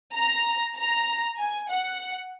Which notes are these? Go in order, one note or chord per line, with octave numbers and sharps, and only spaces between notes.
A#5
A#5
G#5
F#5